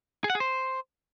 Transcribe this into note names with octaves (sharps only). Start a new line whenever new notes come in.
G#4
F#5
G#4
C5